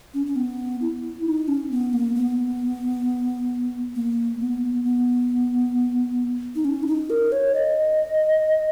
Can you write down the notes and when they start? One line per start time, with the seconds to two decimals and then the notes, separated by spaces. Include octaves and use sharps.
0.14 C#4
0.26 C#4
0.36 B3
0.81 E4
1.26 D#4
1.48 C#4
1.71 B3
1.93 A#3
2.15 B3
3.95 A#3
4.40 B3
4.85 B3
6.55 D#4
6.65 C#4
6.83 E4
6.87 D#4
7.10 A#4
7.32 C#5
7.54 D#5